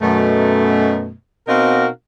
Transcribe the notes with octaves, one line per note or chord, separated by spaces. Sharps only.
F#2 B2 A3
B2 C4 D#4 F#4 A#4 F5